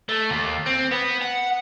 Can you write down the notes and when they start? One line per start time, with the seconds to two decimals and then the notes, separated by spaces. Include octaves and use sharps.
0.09 A3
0.30 D#2
0.66 C4
0.91 B3
1.21 F#5